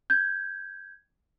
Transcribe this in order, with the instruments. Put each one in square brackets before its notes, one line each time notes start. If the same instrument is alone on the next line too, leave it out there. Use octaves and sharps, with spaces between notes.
[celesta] G6 G#6